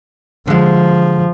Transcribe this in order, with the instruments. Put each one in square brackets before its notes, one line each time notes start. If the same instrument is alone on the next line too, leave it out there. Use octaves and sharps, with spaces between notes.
[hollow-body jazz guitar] D3 G#3 [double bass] F3